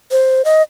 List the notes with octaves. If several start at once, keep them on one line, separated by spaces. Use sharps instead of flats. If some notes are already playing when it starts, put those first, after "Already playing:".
C5
D#5